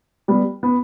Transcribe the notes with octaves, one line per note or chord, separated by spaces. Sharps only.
G3 B3
B3